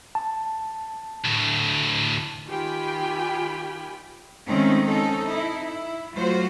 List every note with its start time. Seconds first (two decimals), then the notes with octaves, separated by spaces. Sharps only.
0.15 A5
1.25 D2 A2
2.47 D#3 F4 G4 G5 G#5 B5
4.48 D#3 G#3 A3 C4 C#4 D#4
4.87 C4 C#4 D#4 A4
5.26 D#4 E4
5.62 E4
6.15 F#3 A3 F4 F#4 C5